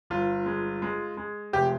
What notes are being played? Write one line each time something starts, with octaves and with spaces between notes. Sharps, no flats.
G1 F4
G#3
G#3
G#3
F1 G4